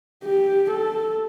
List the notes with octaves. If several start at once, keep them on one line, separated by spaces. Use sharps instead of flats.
G4
A4